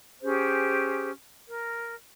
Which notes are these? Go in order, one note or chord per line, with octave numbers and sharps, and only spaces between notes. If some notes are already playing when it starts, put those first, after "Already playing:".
C#4 G4 G#4 C5
A#4